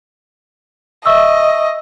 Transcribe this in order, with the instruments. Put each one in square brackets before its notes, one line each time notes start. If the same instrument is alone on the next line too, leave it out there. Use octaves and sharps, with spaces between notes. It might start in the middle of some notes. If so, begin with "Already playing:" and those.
[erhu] D#5 [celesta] E5 C#6 E6